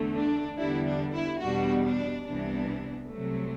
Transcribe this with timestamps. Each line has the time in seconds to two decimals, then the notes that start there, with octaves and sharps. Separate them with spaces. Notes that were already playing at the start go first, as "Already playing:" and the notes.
Already playing: E2 D3 A3
0.15 D4
0.58 E2 D3 G3 B3 D4 E4
0.86 D4
1.14 E4
1.41 E2 B2 G3 B3 D4 F#4
1.84 D4
2.26 C2 C3 E3 B3 D4
3.10 C2 C3 F#3 A3